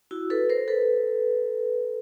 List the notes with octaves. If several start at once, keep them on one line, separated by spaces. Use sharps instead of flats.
E4 F#4
A4 B4
A#4 C5
A4 B4